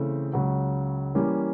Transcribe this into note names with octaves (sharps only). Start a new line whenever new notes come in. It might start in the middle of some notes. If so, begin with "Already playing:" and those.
Already playing: C#3 E3 A3 C4
C#2 C#3 F#3
E3 G3 A#3 C#4